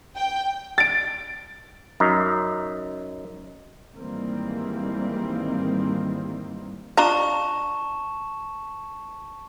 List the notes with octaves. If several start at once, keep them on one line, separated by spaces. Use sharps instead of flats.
G5
A6 D7
F#2 D#4
G#2 D#3 E3 G3 A#3 C4
D4 F4 A5 A#5 C#6 E7